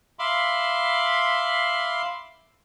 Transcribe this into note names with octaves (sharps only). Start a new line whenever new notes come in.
E5 F5 B5 C6 D6